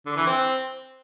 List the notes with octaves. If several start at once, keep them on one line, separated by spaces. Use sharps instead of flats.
D3
E3
C4